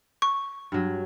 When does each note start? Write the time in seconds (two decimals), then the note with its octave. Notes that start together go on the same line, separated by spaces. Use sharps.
0.22 C#6
0.72 G2 F#3